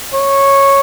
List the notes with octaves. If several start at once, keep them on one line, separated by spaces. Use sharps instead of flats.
C#5